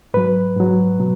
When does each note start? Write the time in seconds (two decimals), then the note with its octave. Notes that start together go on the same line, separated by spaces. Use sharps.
0.14 G#2 F#3 B4
0.56 G#2 F#3
0.99 B2 F#3